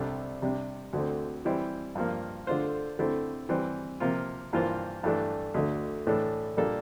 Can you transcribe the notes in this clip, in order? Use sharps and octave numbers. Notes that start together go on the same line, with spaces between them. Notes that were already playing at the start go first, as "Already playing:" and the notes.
Already playing: C2 C3 G3 D4 A4
C3 G3 D4
D2 D3 A3 C4
E3 G3 C4 E4
G2 F3 A#3
D3 A3 D4 F4 C5
D3 A3 C4 E4
E3 G3 C4
C3 F3 A#3 F4
G2 E3 A#3 F4 C5
G2 E3 A3 D4
D2 D3 A3
A2 E3 A3 D4 A4
A#2 G3 A#3 D4 A4